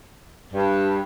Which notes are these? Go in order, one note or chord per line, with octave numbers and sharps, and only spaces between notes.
G2